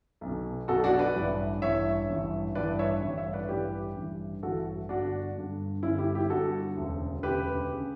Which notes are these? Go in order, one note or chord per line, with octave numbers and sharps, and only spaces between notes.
B1
B2
B1 B2 F#4 A4
D4 F#4
B4 D5
A1 G2 E3
A1 G2 E3 C#5 E5
A1 G2 E3
A1 G2 E3 B4 D5
C#5 E5
A1 G2 E3
C#5 E5
B4 D5
A1 G2 E3 G4 B4
A1 G2 E3
A1 G2 E3 F#4 A4
G1 G2 D3 D4 F#4
G1 G2 D3
G1 G2 D3 C#4 E4
E4 G4
E4 G4
G1 G2 D3 F#4 A4
E1 D2 C#3
E1 D2 C#3 G4 B4
C#3